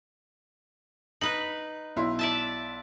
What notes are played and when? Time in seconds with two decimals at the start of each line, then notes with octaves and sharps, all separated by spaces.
1.21 D#4 B4 F#7
1.96 B1 E4 C6
2.19 D5 E5 A5